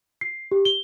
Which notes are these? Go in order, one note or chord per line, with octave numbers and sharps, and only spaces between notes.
C7
G4
G7